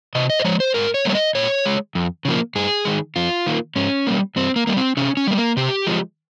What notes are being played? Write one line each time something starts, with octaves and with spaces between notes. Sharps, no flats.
C3 D#5
D#5
C5
F3 G#3 C#5
C5
G#2 A#4
C#5
G3 A#3 C#5
D#5
A#2 C#5
G#3
F2
C#3 F3 A#3
G2 G#4
D#3 G#3
F2 F4
D#3 A#3
G#2 C#4
G3 A#3
G2 C4
A#3
G3 A#3
C4
C3 C#4
C#4
G3 A#3
A#3
C3 G4
F3 G#3